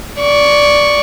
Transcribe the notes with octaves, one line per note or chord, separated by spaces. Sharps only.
D5 C#6